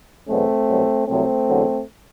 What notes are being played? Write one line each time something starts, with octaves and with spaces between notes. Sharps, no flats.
E2 B2 F#3 A3 C4
C2 B2 F#3
C2 C3 F#3 A3 C4
E2 D3 F#3